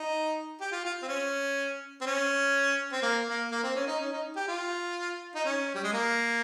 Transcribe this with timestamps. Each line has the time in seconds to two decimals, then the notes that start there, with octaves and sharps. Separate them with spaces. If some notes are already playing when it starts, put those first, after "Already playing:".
Already playing: D#4
0.60 G4
0.72 F4
0.85 F4
1.02 C4
1.08 C#4
2.01 C4
2.06 C#4
2.92 C4
3.03 A#3
3.27 A#3
3.51 A#3
3.63 C4
3.76 C#4
3.87 D#4
4.00 C#4
4.12 D#4
4.36 G4
4.48 F4
5.35 D#4
5.45 C#4
5.74 G3
5.84 G#3
5.93 A#3